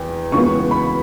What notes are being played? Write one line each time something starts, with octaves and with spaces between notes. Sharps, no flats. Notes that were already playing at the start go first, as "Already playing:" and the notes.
Already playing: E2 G5
C#2 C#3 E3 B3 C#6
B5